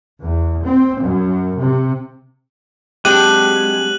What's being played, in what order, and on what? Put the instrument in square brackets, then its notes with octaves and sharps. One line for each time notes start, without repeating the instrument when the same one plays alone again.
[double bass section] E2
C4
F#2
C3
[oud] F#3 C4 D4 [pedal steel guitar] G#3 [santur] G4 [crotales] F#6 D#7 F#7